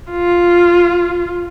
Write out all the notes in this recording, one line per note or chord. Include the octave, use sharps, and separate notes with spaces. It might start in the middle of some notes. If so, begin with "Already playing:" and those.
F4